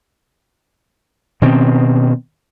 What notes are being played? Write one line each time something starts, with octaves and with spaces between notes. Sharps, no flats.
B2 D#3 C4 C#4